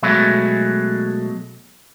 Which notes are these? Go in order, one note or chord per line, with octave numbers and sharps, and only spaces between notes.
B2 F#3 G#3 A3